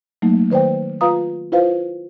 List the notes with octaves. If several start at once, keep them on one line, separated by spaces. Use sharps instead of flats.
F#3 A3 A#3 D#4
D#3 B4 C5 D5 G5
F4 B4 F5 A#5 D#6
E4 F4 B4 C5 F5